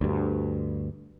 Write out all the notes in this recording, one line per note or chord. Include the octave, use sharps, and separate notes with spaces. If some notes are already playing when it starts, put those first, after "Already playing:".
D2 G2